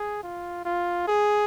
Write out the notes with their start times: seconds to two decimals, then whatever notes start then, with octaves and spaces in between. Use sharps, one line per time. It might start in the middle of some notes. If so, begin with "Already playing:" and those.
Already playing: G#4
0.23 F4
0.65 F4
1.08 G#4